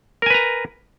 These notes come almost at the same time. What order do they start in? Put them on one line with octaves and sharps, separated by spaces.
A#4 G#5 B4 A#5